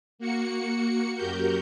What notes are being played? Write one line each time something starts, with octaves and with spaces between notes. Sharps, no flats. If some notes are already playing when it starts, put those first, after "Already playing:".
A#3 F#4 C#7
F#2 F#4 G4 A#4 G6